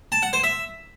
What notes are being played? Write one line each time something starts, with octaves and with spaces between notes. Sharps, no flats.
A5
F#5
C5
E5